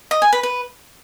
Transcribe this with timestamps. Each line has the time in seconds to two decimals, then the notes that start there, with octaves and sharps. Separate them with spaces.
0.11 D#5
0.22 G#5
0.33 B4
0.43 B4